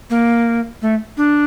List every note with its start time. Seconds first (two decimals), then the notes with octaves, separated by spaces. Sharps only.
0.10 A#3
0.82 A3
1.17 D4